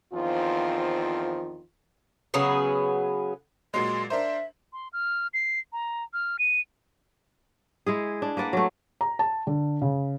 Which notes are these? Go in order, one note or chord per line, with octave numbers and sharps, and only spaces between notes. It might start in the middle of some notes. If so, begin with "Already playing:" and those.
E2 D#3 F3 C4 F4
C#3 F#3 B3 G#4
A#2 F#3 G#3 C6
D4 A#4 C5 E5
C6
F6
C7
A#5
F6
D#7
G#3 E4 G#4
D4
A#3 B4 D5 F#5
F#3 A3
A#5
A5
D3
C#3